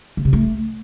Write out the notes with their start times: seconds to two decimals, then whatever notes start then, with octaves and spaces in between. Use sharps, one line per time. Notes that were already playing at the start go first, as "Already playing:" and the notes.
0.17 C#3
0.25 C3
0.33 A3